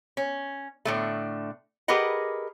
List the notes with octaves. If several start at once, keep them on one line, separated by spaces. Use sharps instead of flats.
C#4
A2 D3 A3
G4 G#4 A#4 B4 D#5 F#5